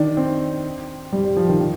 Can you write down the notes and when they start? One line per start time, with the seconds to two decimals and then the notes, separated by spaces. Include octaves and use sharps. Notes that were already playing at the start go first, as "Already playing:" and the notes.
Already playing: D#3 D4
0.17 C4
1.12 G3
1.25 G3
1.37 F3
1.49 D#3
1.60 D#3